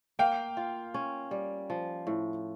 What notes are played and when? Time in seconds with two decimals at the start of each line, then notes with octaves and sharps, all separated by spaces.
0.19 A#3 F5 G5
0.57 F4
0.94 C#4
1.31 G3
1.70 F3
2.07 A2